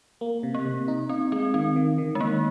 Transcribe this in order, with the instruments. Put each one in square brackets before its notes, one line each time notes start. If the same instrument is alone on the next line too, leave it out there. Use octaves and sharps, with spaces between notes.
[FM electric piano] A#3
C3
[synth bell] A#3
[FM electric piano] C3
D#4
[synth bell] C4 [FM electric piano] D#4
[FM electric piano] G#3 [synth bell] C4
[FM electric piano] D#3 [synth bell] C4
[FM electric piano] D#3
D#3
[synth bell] G#3
[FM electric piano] D#3 [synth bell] A#3